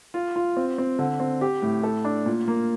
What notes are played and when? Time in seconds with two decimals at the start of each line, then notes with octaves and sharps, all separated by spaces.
0.14 F4
0.36 F4
0.57 C4
0.78 C4
0.99 D3
1.20 C4
1.41 G4
1.62 A2
1.84 A4
2.05 D4
2.26 A#2
2.48 A#3